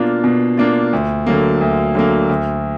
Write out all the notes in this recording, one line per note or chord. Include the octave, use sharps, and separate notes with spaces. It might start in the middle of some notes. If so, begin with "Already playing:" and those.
Already playing: B2 A#3 D4 F4
B2
A#3 D4 F4
D2
D3 F#3 A#3
D2
D3 F#3 A#3
D2